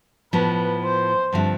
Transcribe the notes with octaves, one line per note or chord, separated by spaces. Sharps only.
A2 F3 B3 B4
C5
G2 D3 F3 A3 C4